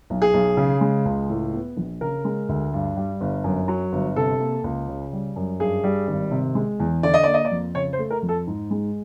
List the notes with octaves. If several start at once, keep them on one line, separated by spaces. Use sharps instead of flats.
B1
G#4
B1
C#3
G#3
C#2
A2
B3
A#1
C#3 A#4
G#3
D2
G2
G3
G1
F#2
F#3
G1
C3 A4
A#3
C#2
C#3
G3
F#2
G2 G#4
G3
G#1
C3
G#3
E2
D3 D5
D#5
A#3 D5
D#5
D5
F2
C#3 C#5
C5
A3
A#4
F2
A4
G#2
G#3